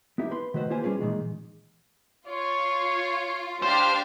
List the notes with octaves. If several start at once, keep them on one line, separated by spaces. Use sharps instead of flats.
B3 D#4 E4 G4
B4 B5 C6
D#3 A3 F#4 B4 C5
A#3 F4 G4 B4 C5 G#5
G3 C#4 F4 G#4 B4
A#2 D#3 E3 G#3
F4 C#5
D4 G4 C5 F5